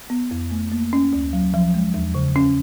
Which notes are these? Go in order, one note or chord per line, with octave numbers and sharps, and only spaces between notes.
B3
F2
A3
A#3
C#4
D2
F#3
F3
G#3
E2
C#3
C#4